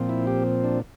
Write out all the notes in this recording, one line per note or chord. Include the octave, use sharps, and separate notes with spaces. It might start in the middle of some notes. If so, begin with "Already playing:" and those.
Already playing: A#2 F3 C4
E4
G4
D4